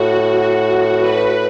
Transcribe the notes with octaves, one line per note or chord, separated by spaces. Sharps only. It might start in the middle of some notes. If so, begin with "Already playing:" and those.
Already playing: A2 F#4
B4